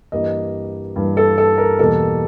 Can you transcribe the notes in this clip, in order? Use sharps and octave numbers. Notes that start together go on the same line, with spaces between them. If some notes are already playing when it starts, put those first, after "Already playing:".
G2 E3 G3 A#3 D#5
G2 E3 G3 A#3
A4
A4
A#4
E2 B2 G3 A#3 A4